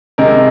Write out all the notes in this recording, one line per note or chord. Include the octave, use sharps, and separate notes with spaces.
C3 D#3 G#3 A#4